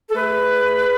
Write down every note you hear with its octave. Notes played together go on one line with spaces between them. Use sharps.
A4
A3 G#4 B4
A3
A3